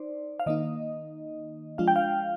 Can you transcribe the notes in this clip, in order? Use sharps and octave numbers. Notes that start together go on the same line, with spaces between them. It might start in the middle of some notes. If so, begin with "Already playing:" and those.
Already playing: D#4 C5 D5
F5
D#3 A#3 D#4 D#5
F3 G#3 D4 F4 F5
G5
F5